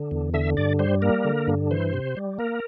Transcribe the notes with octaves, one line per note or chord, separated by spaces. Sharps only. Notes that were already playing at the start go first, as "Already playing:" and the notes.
Already playing: D3
E2
D3 E5
G2 D5
G3 C5
A#3 A#4
D3
G2
E3 C5
C3
G3
A#3 A#4